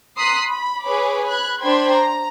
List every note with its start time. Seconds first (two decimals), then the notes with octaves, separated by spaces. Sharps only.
0.18 A#5 C6 D#6 F#6 B6 C7
0.48 B5
0.83 G#4 B4 C#5 B5 D6
1.25 B5 F#6 G#6
1.61 D4 C5 G5 B5 C6 G#6
1.92 A#5